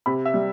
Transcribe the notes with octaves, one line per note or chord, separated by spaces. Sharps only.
C3 B5
E5
G3